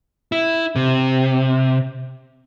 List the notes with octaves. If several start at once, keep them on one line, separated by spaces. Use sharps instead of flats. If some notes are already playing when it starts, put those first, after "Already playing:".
E4
C3